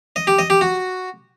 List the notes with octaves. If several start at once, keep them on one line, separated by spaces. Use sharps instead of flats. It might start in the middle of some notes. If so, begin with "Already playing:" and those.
D#5
G4
D#5
G4
F#4